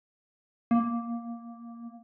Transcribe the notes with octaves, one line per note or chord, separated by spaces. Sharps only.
A#3